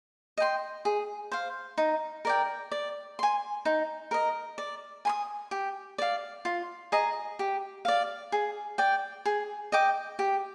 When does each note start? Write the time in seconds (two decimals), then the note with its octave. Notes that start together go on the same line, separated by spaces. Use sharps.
0.38 D#5 G5 C6
0.85 G#4
1.32 C5 F5
1.78 D#4
2.25 A#4 D5 G5
2.72 D5
3.19 G#5 C6
3.65 D#4
4.11 A#4 D#5
4.58 D5
5.05 G#5 C6 D#6
5.51 G4
5.98 D5 F5
6.45 F4
6.92 G#4 D#5 A#5
7.39 G4
7.85 D5 F5
8.32 G#4
8.78 D5 G5
9.25 G#4
9.72 D#5 G5 D6
10.19 G4